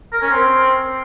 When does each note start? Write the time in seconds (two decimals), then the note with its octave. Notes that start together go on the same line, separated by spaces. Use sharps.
0.13 A#4
0.22 C#4
0.31 C4